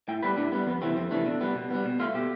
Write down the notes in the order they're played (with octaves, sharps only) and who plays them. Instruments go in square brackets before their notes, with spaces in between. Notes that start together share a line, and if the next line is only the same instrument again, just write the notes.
[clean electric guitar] A2 G5
G3 B3 B4
A2 D4
G3 B3
F2 B3
C3 E3 A3 C4
F2 C4
C3 E3 A3 D4
B2 D4
G3 B3
B2
G3 B3
B2
A3 F4
B2 G4